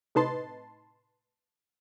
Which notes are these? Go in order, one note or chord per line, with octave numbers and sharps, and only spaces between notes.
A2 C3 D#4 B4 A5 C6